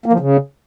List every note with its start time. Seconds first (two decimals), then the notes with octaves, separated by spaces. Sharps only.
0.06 A#3
0.13 F3
0.20 C#3